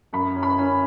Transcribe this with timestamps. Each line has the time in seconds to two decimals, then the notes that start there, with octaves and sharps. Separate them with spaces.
0.13 F#2 B5
0.35 C#4
0.43 B5
0.58 C#4